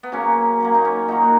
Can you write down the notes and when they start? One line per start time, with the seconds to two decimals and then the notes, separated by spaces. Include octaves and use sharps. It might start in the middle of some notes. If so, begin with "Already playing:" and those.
0.03 B3
0.12 C#3 F#3 A#3 C#4
0.60 C#3 F#3 A#3
0.74 D#4
0.85 C#4
1.08 A#2 D#3 F#3 A#3 D#4
1.24 F#4